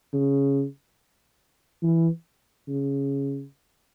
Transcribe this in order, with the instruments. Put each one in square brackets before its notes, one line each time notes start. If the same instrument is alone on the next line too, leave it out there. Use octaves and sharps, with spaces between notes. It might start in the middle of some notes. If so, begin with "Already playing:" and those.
[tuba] C#3
E3
C#3